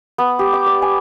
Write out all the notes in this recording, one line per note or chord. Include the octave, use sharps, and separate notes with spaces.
B3
G4
D6
D5
G#5